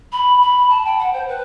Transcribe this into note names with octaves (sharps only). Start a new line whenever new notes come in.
B5
B5
A5
G5
F#5
C5
B4